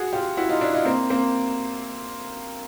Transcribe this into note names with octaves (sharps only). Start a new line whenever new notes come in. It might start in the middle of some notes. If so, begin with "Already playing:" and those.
Already playing: F#4 G#4
F4 G4
E4 F#4
D#4 F4
D4 E4
D#4 F4
A#3 C4
A#3 C4